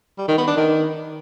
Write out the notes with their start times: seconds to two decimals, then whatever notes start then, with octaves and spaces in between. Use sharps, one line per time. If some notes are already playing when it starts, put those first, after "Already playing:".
0.18 G3
0.28 D#3
0.38 B3
0.47 D4
0.57 D#3